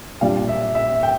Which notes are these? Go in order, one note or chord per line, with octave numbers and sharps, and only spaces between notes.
A#2 G3 D4 F4 F5
E5
E5
G5